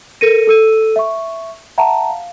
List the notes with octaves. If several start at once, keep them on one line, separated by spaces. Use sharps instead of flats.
A4 A#4 A#6 C#7 D#7
A4 E6 D#7
E5 C#6
E5 F#5 A5 A#5
F5